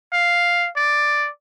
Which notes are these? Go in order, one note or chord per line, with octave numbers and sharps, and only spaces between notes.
F5
D5